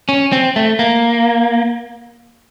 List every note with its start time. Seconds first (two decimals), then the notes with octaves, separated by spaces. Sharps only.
0.09 C#4
0.32 C4
0.56 A3
0.79 A#3